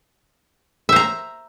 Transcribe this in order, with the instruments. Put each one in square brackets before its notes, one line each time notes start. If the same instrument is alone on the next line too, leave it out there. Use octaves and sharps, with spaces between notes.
[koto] E5
C5
A#5